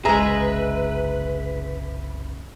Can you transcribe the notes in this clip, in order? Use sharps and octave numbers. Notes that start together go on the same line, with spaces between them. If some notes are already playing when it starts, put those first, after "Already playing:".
F#1 C2 C#3 G#3 G#4 B4 E5 A#5